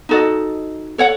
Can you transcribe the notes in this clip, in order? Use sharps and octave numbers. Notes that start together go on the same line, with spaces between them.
D#4 F#4 A4 D#5
A4 C#5 F#5